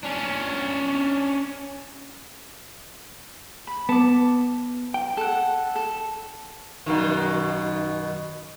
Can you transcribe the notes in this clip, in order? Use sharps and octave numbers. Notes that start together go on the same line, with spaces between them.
C#4 D4
B5
B3 A5 D6
G5
A4 F#5
A4
F#2 B2 D#3